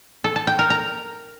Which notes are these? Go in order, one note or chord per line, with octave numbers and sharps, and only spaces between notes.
A4
A5
G5
A#4
A#5